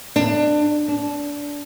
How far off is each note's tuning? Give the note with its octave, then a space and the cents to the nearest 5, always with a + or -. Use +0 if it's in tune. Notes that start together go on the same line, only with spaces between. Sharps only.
D4 +20
D4 -20